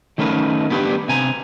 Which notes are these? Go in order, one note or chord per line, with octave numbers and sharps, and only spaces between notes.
D#3 A3 C#4 A#4 B4
B3 D4 G4 A#4 B4
C3 G#5 A#5